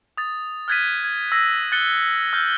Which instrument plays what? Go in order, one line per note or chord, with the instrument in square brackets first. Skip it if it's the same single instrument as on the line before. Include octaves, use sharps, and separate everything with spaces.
[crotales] D#6 A6
F6 F#6 G#6 A6 B6 D#7
G#6
E6 A#6
F#6 A6 C#7 G7
E6 F6 G6